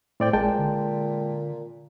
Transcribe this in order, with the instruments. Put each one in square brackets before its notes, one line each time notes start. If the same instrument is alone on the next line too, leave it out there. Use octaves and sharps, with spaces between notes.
[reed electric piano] A2 D5 G5 [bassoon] C4
[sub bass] G#1 [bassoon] A#2 [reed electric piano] G#3 G5 A5
[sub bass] D3